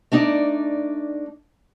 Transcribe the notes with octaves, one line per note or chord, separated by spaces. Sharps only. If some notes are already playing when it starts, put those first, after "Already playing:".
A3 D4 D#4 D5